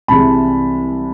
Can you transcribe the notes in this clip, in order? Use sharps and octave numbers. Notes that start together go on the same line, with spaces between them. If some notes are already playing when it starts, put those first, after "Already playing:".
C2 C3 E3 G#3 A5 B5